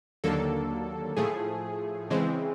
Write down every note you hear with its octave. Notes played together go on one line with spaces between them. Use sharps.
D#2 D3 F#3 A#3 A4
A2 F3 A3 G#4
C#3 E3 G#3 C4